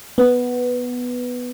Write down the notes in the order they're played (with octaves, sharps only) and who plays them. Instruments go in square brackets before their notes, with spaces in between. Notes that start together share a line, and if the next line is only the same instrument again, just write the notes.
[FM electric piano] B3